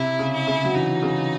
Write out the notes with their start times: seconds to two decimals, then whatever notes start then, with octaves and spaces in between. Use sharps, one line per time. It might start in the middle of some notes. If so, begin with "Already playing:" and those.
Already playing: C3 E4
0.19 C#3
0.34 E4
0.47 C#3
0.65 F#3
0.74 E3 D#4
1.03 C#3